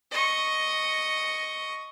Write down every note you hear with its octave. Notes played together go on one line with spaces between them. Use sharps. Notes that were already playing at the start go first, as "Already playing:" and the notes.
D#5 C#6